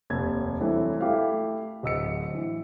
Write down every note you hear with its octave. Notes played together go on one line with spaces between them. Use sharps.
F1 D#2 G#6
E3 F#3 G3 A3 C4
A3 E4 G4 F5
D1 D#5 E6 C#7
E3